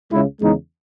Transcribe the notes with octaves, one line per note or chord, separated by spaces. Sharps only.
C#2 C#3 G#3 E4
E2 C#3 G#3 D#4